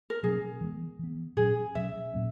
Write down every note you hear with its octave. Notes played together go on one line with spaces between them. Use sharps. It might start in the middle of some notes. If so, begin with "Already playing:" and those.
A#4
B2 F#3 A#3 C#4 G#4
E3 G#3 B3
E3 B3
A#2 F#3 C#4 G#4
B2 F#3 C#4 E5
A#2 F#3 A#3 C#4